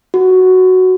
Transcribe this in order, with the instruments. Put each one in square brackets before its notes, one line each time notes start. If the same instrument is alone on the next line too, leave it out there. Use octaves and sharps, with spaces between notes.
[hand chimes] F#4